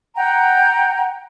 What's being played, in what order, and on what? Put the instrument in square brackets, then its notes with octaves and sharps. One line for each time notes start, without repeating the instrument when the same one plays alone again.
[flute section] F#5 G5 A#5